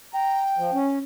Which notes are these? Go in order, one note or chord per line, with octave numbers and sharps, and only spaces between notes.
G5 A#5
F3
C#4